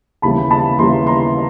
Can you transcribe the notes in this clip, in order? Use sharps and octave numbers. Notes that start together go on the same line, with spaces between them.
D#2 C#3 E3 G3 B3 A5 B5
A5 B5
D#2 C#3 E3 G3 B3 A#5 C6
A#5 C6